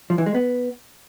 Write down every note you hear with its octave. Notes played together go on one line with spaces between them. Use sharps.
F3
E3
G#3
B3